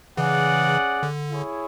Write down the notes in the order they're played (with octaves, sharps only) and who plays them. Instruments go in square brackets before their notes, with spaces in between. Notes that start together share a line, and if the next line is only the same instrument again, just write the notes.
[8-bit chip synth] C#3 E3 [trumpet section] C#4 G#4 D5 F#5
[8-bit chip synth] D3
[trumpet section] E4 G#4 C#5